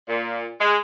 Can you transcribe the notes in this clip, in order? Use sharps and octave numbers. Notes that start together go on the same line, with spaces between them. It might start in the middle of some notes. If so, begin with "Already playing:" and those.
A#2
G#3